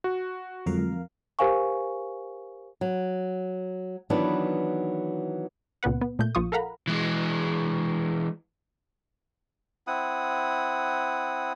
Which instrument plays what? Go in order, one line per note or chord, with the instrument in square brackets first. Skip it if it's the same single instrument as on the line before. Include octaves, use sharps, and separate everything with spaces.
[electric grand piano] F#4
[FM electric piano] F2 A#4 F5 [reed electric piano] D3 F#3 G#3
[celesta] G4 A#4 C5 F5 G#5 C#6
[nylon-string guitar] F#3
D#3 E3 F#3 B3 D4
[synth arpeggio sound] C#2 A#2 B3 B4 F#5
B3
A#2 A3 G6
A#1 F3 F4 C#6 D#6
A4 A#4 F5 F#5 A#5 B5
[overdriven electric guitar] E3 G#3
[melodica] C4 E4 F#5 D#6